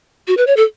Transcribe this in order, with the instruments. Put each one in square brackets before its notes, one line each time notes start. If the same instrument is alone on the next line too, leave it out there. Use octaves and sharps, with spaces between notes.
[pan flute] F#4
B4
C#5
A4